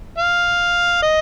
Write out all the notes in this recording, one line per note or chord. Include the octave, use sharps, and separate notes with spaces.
F5
D#5